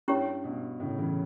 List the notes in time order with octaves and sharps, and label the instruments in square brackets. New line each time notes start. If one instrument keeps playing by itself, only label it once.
[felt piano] G2 [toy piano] C#4 E4 G4 C#5
[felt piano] G2 B2
A2 C#3
C#3 E3